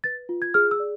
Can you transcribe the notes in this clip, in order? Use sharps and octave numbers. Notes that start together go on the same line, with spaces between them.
B4 A6
F4
G#6
G#4 F6
E6
D5